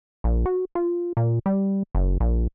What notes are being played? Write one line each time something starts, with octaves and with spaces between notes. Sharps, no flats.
A#1
F#4
F4
A#2
G3
F#1
A#1